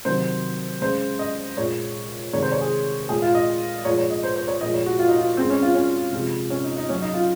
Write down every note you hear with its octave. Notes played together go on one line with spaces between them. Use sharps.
C3 D#3 F#3 C5
C#3 G#3 C5
D#5
A#2 G#3 C#5
C3 D#3 G#3 C#5
C5
C#5
G#4
A#2 G#3 G#4
F4
D#5
A#2 F3 G#3 C#5
C#5
D#5
C5
C5
C#5
A#2 F3 G#3 D#5
C#5
F#4
F4
D#4
F4
C#3 G#3 C4
C#4
F4
C#4
C3 F3 G#3
C#4
D#4
D#4
C#3 F#3 C#4
D#4
F4